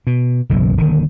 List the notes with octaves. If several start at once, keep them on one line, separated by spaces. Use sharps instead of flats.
B2
F#1 B1 F#2 E3
D#1 D3 D#3